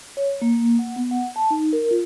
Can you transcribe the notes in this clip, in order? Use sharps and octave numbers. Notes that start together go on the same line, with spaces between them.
C#5
A#3
F#5
B3
F#5
A5
D#4
A#4
F4